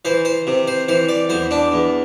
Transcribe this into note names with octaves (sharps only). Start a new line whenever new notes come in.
E3 C5
C5
C3
C5
E3 C5
D5
E2 C5
D4
E2